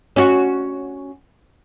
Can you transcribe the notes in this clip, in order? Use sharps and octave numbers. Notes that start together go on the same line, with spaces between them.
C#4 F#4